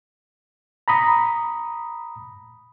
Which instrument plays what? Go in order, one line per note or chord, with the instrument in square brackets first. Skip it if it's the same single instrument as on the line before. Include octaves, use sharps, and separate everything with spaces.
[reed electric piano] A#5 B5 D#6